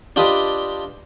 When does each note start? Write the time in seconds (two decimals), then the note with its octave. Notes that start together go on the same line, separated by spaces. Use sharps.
0.16 D4 F4 G4 B4 D#5